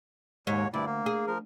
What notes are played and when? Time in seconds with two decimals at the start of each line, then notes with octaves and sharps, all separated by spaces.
0.47 D#2 G#2 C#5
0.74 D2 G2 E4 D5
0.86 A#3
1.06 G#4
1.27 F3 A#4